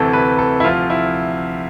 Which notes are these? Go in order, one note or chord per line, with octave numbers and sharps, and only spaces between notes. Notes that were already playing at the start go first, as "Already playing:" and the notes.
Already playing: D2 C3 E3 A4
B4
A4
E4
D2 C3 F3 F4
E4